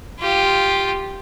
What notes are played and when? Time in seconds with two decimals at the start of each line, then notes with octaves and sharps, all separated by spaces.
0.20 F4 G4